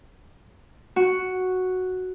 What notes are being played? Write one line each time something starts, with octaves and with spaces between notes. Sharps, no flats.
F#4